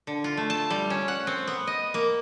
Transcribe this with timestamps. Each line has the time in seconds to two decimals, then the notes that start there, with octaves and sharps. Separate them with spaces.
0.07 D3
0.24 F4
0.37 A3
0.50 A5
0.70 G3
0.90 C#4
1.08 F#5
1.27 C4
1.47 B3
1.67 D#5
1.94 A#3